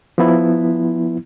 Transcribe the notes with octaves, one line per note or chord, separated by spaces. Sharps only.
F3 B3 E4